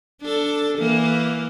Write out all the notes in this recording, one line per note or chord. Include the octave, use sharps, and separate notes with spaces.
D4 A4
E3 A#3